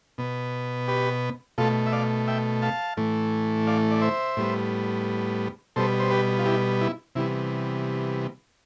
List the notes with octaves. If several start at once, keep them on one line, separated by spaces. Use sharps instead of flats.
B2 B3
G4 B4
B2 A3 F4 A4
E5
D5 F5
E5 G5
F5 A5
A2 E3 A3
D5 F5
D5
C5 E5
A2 G3 B3
B2 G3 B3 A4 C5
C5
G4 B4
F4
E4 G4
E4
C3 E3 G3 B3 E4